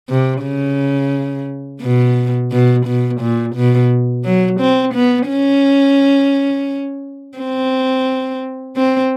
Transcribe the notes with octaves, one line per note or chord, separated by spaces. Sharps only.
C3
C#3
B2
B2
B2
A#2
B2
F#3
C4
B3
C#4
C4
C4